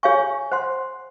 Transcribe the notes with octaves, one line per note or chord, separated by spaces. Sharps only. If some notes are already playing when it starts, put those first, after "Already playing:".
G#4 C#5 F5 G#5 C#6
C5 F#5 C6